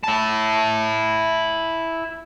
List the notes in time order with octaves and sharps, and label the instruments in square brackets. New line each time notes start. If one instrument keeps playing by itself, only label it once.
[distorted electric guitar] E4 A5